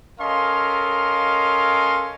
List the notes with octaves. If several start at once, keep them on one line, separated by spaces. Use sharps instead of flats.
C#4 A4 A#4 D#5 F5 C6